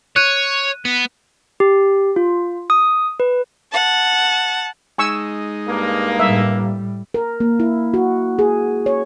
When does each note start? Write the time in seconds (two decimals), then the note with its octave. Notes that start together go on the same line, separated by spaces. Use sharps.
0.16 C#5 F#6 D#7
0.85 B3
1.60 G4
2.16 F4
2.70 D#6
3.20 B4
3.72 F#5 A5
4.98 G#3 D#4 G#5 C#6 E6
5.67 G2 A#3
6.19 A2 G3 E5
7.14 A#4
7.40 A#3
7.60 E4
7.94 F#4
8.39 G#4
8.86 C#5